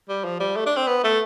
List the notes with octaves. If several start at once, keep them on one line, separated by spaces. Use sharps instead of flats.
G3
F3
G3
A3
D4
C4
B3
A3